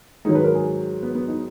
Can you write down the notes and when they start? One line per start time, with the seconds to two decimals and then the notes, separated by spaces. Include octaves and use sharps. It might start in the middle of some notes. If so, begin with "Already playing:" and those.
0.25 G#2 D#3 F#3 D#4
0.35 B4
0.44 A#4
0.54 G#4
1.03 B3
1.15 B3
1.28 D#4